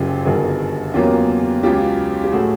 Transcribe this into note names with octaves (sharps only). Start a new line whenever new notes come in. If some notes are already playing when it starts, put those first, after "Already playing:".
Already playing: F#1 F#2 C#3 F4 G4
G1 G2 D#3 G3 F#4 G#4
E2 C#3 F#3 A#3 C#4 F4 G4
C#2 C#3 F#3 F4 G4
G4
A2 F#3 A3 F#4 G#4